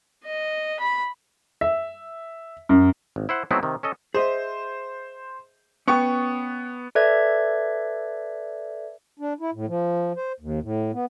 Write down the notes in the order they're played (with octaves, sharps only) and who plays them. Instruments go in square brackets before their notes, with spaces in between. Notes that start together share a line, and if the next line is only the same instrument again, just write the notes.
[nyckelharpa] D#5
B5
[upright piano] E5
F#2
[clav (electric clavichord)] G#1
E4 C5 F#5
F#3 A3 B3 C4 D#4 E4
C3 D#3
C#4 A4 D#5
[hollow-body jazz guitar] G#4 D#5 E5 [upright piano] C5
[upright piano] B3 C#6 [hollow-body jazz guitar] C#4 B4 G5
[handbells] A4 B4 D5 E5 G#6
[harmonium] D4
E4
A2
F3
C5
D#2
A2
B3